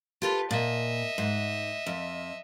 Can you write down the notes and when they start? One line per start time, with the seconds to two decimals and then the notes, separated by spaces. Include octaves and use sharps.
0.22 F4 G4 A4 B4
0.51 A#2 D#5 E5
1.18 G#2
1.87 F2